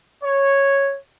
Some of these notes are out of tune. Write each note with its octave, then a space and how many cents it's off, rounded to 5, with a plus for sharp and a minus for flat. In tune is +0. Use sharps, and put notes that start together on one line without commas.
C#5 -5